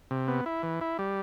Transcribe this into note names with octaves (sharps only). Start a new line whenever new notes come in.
C3
B3
E4
E3
E4
G3